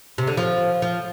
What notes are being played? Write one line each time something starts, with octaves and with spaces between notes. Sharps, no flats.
C3
D3
F3
F3